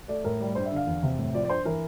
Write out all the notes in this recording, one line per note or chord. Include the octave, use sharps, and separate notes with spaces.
A3 D5
A2 A#4
G3
G2 C5
E5
D3 F5
E2
C3
A2
F3 D5
D5
G2 C5
E3 A#4